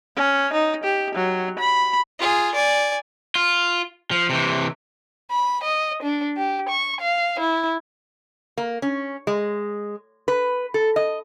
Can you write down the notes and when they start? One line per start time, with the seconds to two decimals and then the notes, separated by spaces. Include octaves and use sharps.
0.16 C#4
0.53 D#4
0.83 G4
1.15 F#3
1.59 B5
2.19 F4 G#4
2.55 D5 G#5
3.35 F4
4.11 F3
4.29 C3 E3
5.31 B5
5.64 D#5
6.03 D4
6.37 G4
6.69 C#6
7.01 F5
7.40 E4
8.58 A#3
8.82 C#4
9.27 G#3
10.28 B4
10.74 A4
10.96 D#5